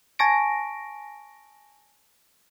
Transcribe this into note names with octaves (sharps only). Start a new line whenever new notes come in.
G#5 A5 C#6 A#6 D7